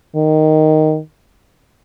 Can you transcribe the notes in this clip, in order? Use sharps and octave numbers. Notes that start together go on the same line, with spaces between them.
D#3